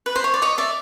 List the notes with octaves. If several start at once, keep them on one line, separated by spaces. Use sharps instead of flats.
B4
C5
C#5
D5
C#5 D#5
D5 E5